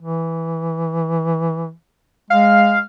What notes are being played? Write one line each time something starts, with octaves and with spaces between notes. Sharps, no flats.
E3
G#3 F5